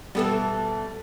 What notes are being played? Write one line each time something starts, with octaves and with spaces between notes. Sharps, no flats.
B2 E3 G3 A3 B3 A4